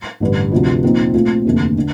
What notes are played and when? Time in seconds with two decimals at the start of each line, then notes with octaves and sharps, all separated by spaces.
0.20 A1 G2 D3
0.52 D2 C3 F3
0.83 A#1 A#2 F3 C4 D#4
1.14 A#2 A3 C4 F4
1.46 F1 D#2 D3 A3
1.78 D3